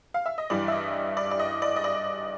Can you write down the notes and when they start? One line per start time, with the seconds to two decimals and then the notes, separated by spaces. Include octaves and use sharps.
0.14 F5
0.26 E5
0.38 D#5
0.50 G2 E3 G3 D5
0.68 E5
0.72 D#5
1.17 D5
1.31 D5
1.39 D#5
1.62 D5
1.76 D#5
1.84 D5